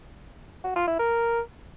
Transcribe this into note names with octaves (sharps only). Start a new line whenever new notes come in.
F#4
F4
E4
A#4